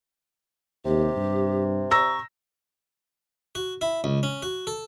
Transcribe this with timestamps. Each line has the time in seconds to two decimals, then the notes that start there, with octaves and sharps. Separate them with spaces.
0.85 D#2 C3 G4
1.16 G2
1.91 A#5 C#6 E6 A#6
3.55 F#4
3.81 E4
4.04 C#2
4.23 C#4
4.43 F#4
4.67 A4